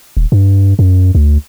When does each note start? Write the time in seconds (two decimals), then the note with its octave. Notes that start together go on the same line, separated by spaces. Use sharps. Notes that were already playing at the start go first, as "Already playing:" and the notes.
0.17 D#1
0.32 G2
0.79 F#2
1.15 D2